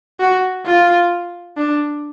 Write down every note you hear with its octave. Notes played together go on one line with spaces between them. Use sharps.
F#4
F4
D4